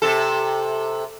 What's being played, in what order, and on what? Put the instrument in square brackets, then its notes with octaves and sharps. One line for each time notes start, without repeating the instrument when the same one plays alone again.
[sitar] C3 A4